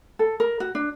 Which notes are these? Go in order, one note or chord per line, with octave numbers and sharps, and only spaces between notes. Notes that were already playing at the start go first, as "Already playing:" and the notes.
A4
A#4
F#4
D4